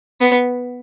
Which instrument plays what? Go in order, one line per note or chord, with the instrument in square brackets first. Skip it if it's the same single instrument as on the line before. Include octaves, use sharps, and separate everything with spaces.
[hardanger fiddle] B3